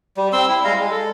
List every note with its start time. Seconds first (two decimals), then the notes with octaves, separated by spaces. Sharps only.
0.17 G3
0.33 C4 C6 E6
0.48 E4
0.64 G3 G#3 F5 A#5
0.79 G#3
0.92 A4